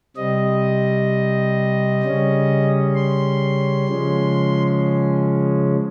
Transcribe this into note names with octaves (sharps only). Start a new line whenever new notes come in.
C3 G3 C4 D#5
C#3 G3 C#4
C6
C#3 F3 G#3 C#4